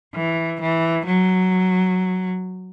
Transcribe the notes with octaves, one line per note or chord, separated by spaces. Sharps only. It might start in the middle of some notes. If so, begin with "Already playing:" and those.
E3
E3
F#3